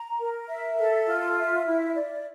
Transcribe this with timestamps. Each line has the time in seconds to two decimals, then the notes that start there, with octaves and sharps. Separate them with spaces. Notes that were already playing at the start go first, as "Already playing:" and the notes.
Already playing: A#5
0.19 A#4
0.49 E5
0.78 A4
1.08 F4
1.37 E5
1.66 E4
1.95 D5